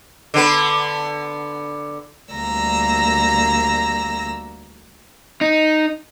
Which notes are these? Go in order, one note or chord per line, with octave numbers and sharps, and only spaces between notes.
D3 B3 B4
D2 G3 A#3 A#5 E6 A#6
D#4